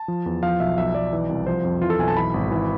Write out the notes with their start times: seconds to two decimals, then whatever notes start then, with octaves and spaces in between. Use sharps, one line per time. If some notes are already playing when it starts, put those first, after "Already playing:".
Already playing: A5
0.08 F3
0.26 E2
0.43 F3 F5
0.60 B1 E5
0.78 B1 E5
0.95 B1 D5
1.13 E3
1.29 C2
1.47 F3 C5
1.65 F2
1.81 E3 F4
1.90 A4
1.99 B1 G#5
2.08 A5
2.16 E3 B5
2.34 G#1
2.52 E3